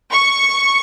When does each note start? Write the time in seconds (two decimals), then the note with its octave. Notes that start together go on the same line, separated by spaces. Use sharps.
0.11 C#6